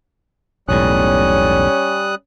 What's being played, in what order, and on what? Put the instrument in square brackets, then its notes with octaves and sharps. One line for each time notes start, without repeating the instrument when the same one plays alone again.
[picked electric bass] E1 B1 A2 [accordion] G3 D#6 F#6 [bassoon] C#4